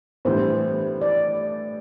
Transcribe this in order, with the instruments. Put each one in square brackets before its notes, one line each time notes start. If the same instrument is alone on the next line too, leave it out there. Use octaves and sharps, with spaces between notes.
[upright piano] A2 E3 G3 B3 D4 [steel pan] C5
[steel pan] D5